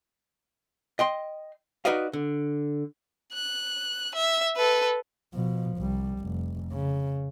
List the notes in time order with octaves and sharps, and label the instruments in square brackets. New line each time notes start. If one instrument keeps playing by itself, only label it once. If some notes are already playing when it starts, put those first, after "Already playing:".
[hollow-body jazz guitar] D#5 G5 C6
D#4 F#4 B4 D5 D#5 F5
D3
[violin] F#6
E5
A4 B4
[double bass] B2 F3
C2 G3
F1
C#3